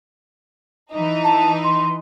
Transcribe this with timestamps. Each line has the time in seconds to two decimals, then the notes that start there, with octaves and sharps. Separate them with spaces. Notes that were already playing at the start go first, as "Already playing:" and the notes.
0.91 E3 D#4
1.24 A5
1.64 C6